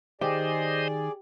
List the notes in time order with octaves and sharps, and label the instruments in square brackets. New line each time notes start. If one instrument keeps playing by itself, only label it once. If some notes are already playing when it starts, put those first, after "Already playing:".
[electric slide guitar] D#3 [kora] G4 [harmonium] G#4 D5 [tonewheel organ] C5 D#5